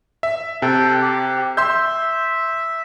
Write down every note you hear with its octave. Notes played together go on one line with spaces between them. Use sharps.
E5
C3 A4 G5
G4
E5 C6 E6 G6